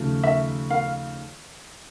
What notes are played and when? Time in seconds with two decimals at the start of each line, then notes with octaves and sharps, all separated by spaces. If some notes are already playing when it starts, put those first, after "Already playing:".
Already playing: D#2 C#3 F3 A3
0.24 E5
0.70 F5